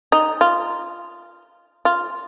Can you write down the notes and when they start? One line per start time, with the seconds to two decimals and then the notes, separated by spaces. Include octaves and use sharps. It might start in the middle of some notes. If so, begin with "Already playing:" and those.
0.12 D#4
0.41 F4
1.85 F4